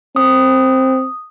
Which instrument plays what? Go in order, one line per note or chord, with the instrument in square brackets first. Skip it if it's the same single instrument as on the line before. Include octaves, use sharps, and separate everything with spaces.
[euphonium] C4 [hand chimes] D#6